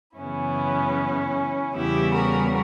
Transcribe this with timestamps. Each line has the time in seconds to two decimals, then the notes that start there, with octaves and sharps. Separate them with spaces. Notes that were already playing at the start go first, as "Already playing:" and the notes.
0.17 F#2 C#3 E3 B3 C#4 E4
1.76 E2 C#3 G3 B3 E4 G4
2.15 F#4 A#4